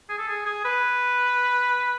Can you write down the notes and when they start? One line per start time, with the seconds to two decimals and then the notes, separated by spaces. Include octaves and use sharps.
0.09 G#4
0.18 A4
0.28 G#4
0.46 G#4
0.65 B4